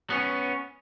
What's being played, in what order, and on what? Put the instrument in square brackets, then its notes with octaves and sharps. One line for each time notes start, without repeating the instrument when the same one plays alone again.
[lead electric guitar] B3 C#4